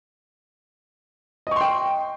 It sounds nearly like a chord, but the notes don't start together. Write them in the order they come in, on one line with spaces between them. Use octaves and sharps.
D#5 C#6 C6 G5